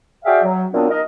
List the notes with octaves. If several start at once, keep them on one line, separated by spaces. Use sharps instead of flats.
F#4 G#4 D5 E5 F5 G5
F#3
A#2 F#3 B3 C4 D4
D#4 A#4 D#5